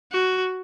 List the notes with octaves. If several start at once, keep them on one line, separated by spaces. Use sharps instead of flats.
F#4